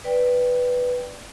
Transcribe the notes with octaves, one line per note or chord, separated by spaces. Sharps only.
B4 D5 G5